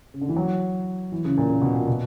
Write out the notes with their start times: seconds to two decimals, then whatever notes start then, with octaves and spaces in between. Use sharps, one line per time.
0.14 C#3
0.21 D3
0.29 E3
0.36 F#3
1.12 E3
1.25 C#3
1.37 A#2
1.50 C#3
1.62 B2
1.74 A#2
1.87 B2